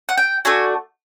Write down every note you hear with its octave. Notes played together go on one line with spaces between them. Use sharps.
F#5
G5
A3 D4 F#4 G#5